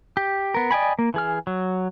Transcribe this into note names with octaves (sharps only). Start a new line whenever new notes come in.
G4
B3 A#4
D5 D#5 G5 G#5 B5
A#3
E3 G#4 F6
F#3